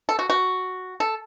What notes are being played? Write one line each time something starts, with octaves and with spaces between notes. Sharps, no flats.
A4
F#4
F#4
A4